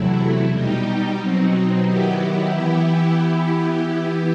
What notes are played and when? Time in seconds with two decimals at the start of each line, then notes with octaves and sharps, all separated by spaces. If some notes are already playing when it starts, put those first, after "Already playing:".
Already playing: E2 C3 F#3 A3 E4
0.47 B2 G3 D#4 G4
1.15 B2 F#3 C4 D#4
1.82 D#3 F#3 B3 E4 G4
2.49 E3 B3 E4 G4